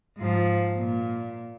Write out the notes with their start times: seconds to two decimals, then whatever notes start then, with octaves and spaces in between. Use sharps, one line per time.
0.18 G#2 F3
0.76 A#2